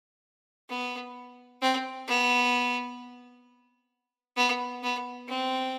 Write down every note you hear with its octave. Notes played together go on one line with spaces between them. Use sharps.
B3
C4
B3
B3
B3
C4